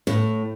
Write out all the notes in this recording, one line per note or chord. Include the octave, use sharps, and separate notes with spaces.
A2